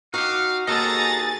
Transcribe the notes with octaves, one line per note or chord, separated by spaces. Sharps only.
D#4 F#4 G4 F5
D#2 F#4 G#4 A4 D#5 A#5 A6